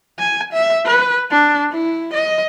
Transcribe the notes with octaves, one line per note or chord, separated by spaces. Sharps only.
G#5
E5
B4
D4
E4
D#5